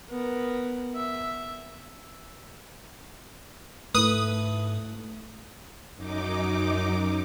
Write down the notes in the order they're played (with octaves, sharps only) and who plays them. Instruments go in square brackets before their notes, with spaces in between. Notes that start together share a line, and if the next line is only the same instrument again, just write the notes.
[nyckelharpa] B3 A#4
E5
[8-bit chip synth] G#2 [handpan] A3 E4 [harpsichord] B4 [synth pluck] D#6
[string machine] F#2 D#4 D6